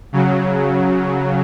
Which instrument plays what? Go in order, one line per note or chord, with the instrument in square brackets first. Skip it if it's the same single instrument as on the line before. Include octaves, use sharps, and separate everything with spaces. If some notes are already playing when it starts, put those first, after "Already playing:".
[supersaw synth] C#3 F#3